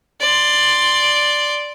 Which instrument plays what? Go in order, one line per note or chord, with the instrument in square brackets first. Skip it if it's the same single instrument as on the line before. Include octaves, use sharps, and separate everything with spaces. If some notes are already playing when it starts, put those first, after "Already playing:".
[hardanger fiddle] D5 C6